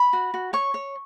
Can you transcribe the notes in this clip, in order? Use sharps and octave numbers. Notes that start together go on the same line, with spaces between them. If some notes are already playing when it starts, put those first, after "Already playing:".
Already playing: B5
F#4
F#4
C#5 C#6
C#5